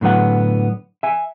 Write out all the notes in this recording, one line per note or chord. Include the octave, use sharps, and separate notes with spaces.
A2 D3 F#3 B3 F#5
E5 G#5